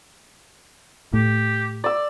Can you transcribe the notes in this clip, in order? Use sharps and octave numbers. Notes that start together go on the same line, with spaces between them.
A2 G4
D5 E6